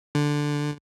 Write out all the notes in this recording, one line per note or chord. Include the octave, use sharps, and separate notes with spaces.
D3